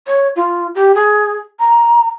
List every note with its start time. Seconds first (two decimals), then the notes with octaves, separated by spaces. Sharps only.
0.07 C#5
0.36 F4
0.75 G4
0.95 G#4
1.60 A#5